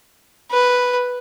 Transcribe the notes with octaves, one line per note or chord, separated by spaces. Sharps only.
B4